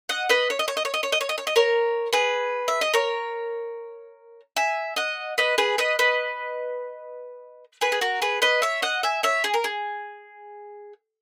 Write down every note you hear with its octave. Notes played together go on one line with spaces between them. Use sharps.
D#5 F#5
B4 D#5
C#5
D#5
C#5
D#5
C#5
D#5
C#5
D#5
C#5
D#5
C#5
D#5
A#4 C#5
G#4 B4
E5
D#5
A#4 C#5
E5 G#5
D#5 F#5
B4 D#5
G#4 B4
B4 D#5
B4 D#5
G#4 B4
G#4
F#4 A#4
G#4 B4
B4 D#5
C#5 E5
D#5 F#5
E5 G#5
C#5 E5
G#4
A#4
G#4